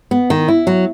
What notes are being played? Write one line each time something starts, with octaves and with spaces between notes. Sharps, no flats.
B3
D#3
E4
F#3